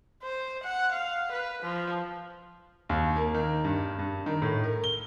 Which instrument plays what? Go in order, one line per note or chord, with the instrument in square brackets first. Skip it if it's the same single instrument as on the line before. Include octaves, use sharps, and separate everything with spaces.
[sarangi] C5
F#5
F5
B4
F3
[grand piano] D#2
A#3
D#3
G2
G2
D#3
A2
A#4
G7